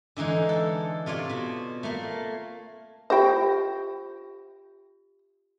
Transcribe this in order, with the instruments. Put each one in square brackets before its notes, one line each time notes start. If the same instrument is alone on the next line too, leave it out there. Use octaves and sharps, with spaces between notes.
[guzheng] D3 E3 G#3 D#4
A4
C3 F4 C#5 D5
B2 B5
A3 A#3
[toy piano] F4 G4 E5 [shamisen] C5 G5